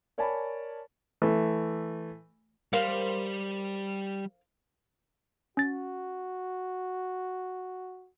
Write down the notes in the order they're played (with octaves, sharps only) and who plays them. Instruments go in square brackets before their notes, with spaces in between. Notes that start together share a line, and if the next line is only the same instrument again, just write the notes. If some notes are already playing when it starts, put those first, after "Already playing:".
[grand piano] A#4 C#5 D5 G#5 A5 B5
[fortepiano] E3 A3
[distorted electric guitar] G3 [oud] A#4 C5 F5
[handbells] C#4 A6 [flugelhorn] F#4